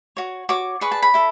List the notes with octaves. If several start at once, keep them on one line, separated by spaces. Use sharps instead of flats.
F#4 C#5
F#4 C#5 D6
G#4 B4 D5 C#6
A5
B5
E4 A4